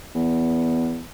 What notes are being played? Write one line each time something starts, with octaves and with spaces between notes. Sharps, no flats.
E2